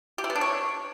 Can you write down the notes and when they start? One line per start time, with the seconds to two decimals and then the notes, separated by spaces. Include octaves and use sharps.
0.18 G4
0.24 E4
0.30 B3
0.36 D4
0.41 C#5